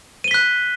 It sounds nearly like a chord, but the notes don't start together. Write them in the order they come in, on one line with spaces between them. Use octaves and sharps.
D#7 G7 B6 F#6